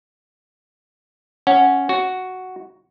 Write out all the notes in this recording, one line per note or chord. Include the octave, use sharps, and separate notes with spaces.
C#4 F#5
F#4